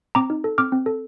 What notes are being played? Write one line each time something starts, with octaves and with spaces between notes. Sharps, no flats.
C4 A#5 D6
D#4
A4
C4 D6 F6
C4
A4